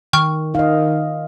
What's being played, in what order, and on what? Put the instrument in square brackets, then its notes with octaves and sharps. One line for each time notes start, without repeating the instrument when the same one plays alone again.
[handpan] D#3 [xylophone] G5 C#6 F6
[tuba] D#3 [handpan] D#5 F5